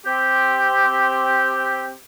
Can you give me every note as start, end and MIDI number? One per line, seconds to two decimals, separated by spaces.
0.06 1.92 60
0.06 1.92 67